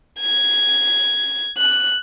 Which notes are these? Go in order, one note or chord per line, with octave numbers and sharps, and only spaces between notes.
G#6
F#6